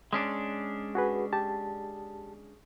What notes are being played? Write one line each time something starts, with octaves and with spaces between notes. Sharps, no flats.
G#3 C#4 D4
F#4 G#4 B4
G4 A5